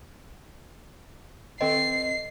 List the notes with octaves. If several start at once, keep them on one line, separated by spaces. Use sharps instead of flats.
D#3 C4 A4 C5 D#5 G5 C7